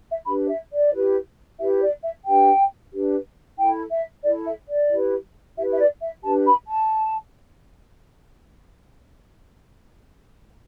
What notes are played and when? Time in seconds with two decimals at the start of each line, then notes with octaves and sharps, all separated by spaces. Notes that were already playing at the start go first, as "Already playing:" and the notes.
0.09 E5
0.26 D4 G4 B4 B5
0.48 E5
0.70 D5
0.92 E4 G4 B4
1.58 E4 G4 B4 E5
1.81 D5
2.03 E5
2.25 D4 G4 B4 G5
2.91 D4 G4 B4
3.58 E4 A4 G5
3.91 E5
4.24 E4 A4 D5
4.46 E5
4.69 D5
4.90 E4 G4 B4
5.57 E4 G4 B4 E5
5.73 E5
5.79 D5
6.02 E5
6.23 D4 G4 B4 A5
6.46 B5
6.68 A5